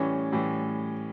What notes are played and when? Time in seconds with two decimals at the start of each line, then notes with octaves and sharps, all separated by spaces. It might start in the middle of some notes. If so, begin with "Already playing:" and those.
Already playing: A2 E3 G3 C#4
0.32 A2 E3 G3